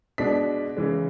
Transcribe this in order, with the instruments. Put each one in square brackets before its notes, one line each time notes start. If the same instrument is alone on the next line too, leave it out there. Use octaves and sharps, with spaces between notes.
[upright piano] B2 G#3 B3 D4 B6
C#3 E3 G#3